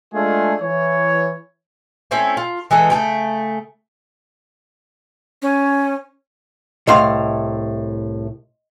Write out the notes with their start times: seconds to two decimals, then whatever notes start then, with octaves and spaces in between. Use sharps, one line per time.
0.13 G#3 A3 D4 F4 G#4
0.62 E3 C#5
2.11 A3 C4 C#4 E4
2.37 F4
2.71 E3 G#3 A3 B3
2.90 C#3 A3 C#4 G5
5.42 C#4
6.87 C2 A2 D#5 F5 C6